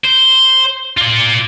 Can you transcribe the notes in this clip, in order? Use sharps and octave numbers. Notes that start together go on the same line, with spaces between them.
C5
F4 D5